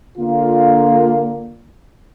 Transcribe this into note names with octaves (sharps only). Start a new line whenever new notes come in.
D3 A#3 F4